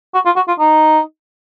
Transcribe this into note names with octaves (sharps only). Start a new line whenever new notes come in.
F#4
F4
F#4
F4
D#4